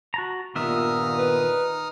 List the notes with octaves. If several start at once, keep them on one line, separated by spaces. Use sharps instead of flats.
F#4 A5 A#5
G2 A#2 D#3 B3 D#4 E5 D#6 F6
B4